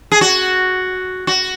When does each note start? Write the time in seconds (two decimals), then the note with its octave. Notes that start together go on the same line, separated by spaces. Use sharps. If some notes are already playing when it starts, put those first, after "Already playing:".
0.12 G#4
0.21 F#4
1.27 F#4